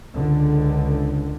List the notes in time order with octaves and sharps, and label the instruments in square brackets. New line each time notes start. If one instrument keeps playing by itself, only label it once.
[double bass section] C#2 D3